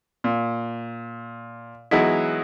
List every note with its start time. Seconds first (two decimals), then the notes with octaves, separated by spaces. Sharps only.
0.24 A#2
1.91 E3 F#3 G#3 B3 D#4 E4